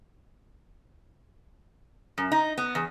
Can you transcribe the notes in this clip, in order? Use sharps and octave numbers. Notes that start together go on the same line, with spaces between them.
F#2
D#4
B3
E2